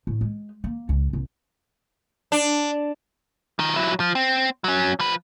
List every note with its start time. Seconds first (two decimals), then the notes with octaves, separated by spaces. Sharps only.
0.07 A2
0.21 G#3
0.64 A#3
0.89 C#2
1.13 C2
2.32 D4
3.59 D#3 F3
3.76 F#3 E4
4.00 F3
4.15 C4
4.64 F#3 C#4
5.00 F3 B4